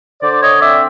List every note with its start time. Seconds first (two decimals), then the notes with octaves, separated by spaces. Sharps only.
0.22 D3 C5 D5
0.41 C#5 D#5
0.60 C4 D5 E5